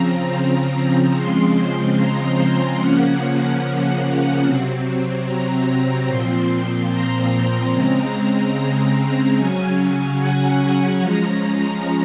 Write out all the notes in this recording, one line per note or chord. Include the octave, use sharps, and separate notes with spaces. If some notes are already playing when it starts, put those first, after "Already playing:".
Already playing: C#3 F3 C4 A#5
A#5
C#3 F3 G#3 C4 C6
A#5
C#3 F3 A#3 C#4 F#5
C3 F#3 C4
A#5
A#2 F3 C4 C6
A#5
C#3 G#3 C4 A#5
A#5
A#5
C#3 F#3 C#4 G#5
F#5
F3 G#3 C#4 A#5